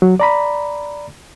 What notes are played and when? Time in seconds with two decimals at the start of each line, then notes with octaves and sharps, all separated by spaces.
0.02 F#3
0.20 D5 A#5 B5